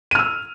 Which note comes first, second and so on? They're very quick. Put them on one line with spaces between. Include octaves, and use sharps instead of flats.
D#7 F6 E6